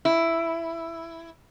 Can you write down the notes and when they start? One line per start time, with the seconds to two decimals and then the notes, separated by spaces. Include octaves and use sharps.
0.05 E4